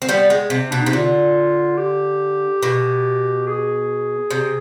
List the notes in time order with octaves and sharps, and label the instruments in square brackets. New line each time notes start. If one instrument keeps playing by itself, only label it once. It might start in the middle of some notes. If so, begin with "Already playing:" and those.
[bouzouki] C4
G3 B3
G#3
C3
[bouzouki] B2 [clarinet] D4
[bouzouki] C3 [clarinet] D#4
[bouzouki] D3 [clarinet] F4
[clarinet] G4
[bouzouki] B2
[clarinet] G#4
[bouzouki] C3